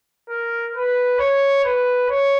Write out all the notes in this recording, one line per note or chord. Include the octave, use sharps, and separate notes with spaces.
A#4
B4
C#5
B4
C#5